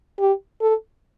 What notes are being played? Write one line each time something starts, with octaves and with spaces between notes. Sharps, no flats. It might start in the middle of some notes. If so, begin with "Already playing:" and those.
G4
A4